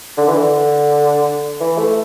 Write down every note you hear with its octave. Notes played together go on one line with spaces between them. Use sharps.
D3
E3
D3
E3
A3